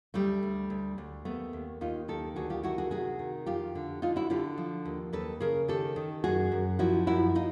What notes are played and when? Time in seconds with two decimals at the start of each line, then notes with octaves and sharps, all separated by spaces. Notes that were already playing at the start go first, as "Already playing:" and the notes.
0.14 D2 G3 A3
0.43 D2
0.70 D2
0.98 D2
1.25 D#2 A3 B3
1.53 D#2
1.81 D#2 D#4 F4
2.08 D#3 G4 A4
2.36 D2 F#4 G#4
2.50 F4 G4
2.63 D#3 E4 F#4
2.78 F#4 G#4
2.91 C3 F#4 G#4
3.19 D#3
3.46 F2 F4 G4
3.75 D3
4.02 D3 D#4 F4
4.16 E4 F#4
4.30 D3 F4 G4
4.58 F3
4.85 D#2
5.13 D#2 A4 B4
5.40 C#3 G#4 A#4
5.68 D#3 G4 A4
5.96 D#3
6.24 F#2 F#4 G#4
6.52 F#2
6.79 F3 E4 F#4
7.07 F#2 E4 F#4
7.35 D#4 F4